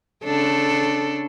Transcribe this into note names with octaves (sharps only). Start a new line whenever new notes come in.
C#3 D4 A4